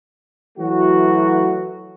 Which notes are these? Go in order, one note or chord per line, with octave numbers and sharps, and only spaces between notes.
E3 F#3 A3 F#4